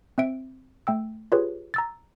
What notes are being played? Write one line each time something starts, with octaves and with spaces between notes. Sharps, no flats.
C4 E5 D7
A3 G5 E6
F4 G4 G#4 B4 C#5
A#5 E6 A6